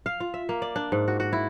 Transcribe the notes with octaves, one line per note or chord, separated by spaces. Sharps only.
F5
F4
E5
A#3
D5
D4
G#2
F#4
F#4
E4